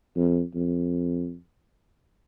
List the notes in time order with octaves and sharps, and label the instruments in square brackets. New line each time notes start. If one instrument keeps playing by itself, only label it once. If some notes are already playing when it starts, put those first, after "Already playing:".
[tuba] F2
F2